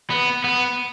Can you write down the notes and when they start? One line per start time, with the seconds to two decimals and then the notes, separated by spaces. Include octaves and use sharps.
0.10 B3
0.44 B3